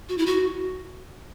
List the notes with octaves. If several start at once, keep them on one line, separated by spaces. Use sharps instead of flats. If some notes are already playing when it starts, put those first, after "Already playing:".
F#4
E4
F#4